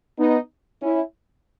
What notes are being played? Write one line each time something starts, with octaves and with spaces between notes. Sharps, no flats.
B3 D#4
C#4 E4